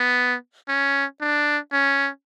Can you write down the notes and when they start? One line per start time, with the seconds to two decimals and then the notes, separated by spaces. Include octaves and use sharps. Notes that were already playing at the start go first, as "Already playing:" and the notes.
Already playing: B3
0.68 C#4
1.21 D4
1.72 C#4